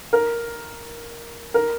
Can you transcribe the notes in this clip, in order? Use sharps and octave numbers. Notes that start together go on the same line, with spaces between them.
A#4
A#4